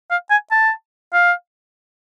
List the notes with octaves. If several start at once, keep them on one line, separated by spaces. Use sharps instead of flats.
F5
G#5
A5
F5